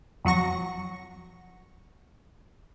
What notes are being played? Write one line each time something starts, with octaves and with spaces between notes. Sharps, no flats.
F2 F#3 F#4 C#6 A#6